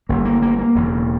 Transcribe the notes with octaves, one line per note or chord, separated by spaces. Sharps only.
G1 G2 A#3
A#3
A#3
A#3
E1 E2 C#3